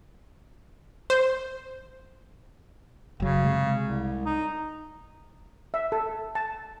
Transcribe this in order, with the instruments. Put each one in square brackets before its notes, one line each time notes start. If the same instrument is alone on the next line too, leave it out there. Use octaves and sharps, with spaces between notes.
[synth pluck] C5
[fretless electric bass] F#1 F#3 [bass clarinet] C#3
[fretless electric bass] C3 G#3
[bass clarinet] C2
D#4
[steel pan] E5
A4
A5